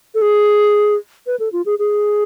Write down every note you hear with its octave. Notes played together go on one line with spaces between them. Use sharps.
A4
G#4
B4
A4
F4
G#4
G#4